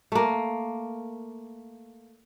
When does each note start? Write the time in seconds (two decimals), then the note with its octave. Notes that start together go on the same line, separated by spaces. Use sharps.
0.12 A3 A#3